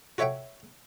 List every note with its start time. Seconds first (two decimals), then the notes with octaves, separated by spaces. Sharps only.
0.18 F#4 A4 C#5 E5 F#5 G5